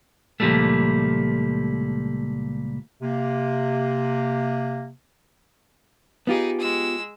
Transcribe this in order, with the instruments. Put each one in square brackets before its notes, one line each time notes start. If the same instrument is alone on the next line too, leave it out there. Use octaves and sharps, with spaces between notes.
[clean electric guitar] C#2 A#2 D#3 F3 G3 A3
[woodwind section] C3 A#3
[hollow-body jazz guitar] B3 F4 G4 [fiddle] D#4 G#4
[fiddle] G#3 E6